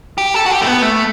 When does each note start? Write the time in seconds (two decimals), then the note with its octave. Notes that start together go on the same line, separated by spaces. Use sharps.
0.18 G4
0.34 A4
0.46 F#4
0.51 G4
0.62 A3
0.67 B3
0.82 A3